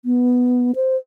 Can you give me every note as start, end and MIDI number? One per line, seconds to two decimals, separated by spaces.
0.05 0.72 59
0.76 0.96 72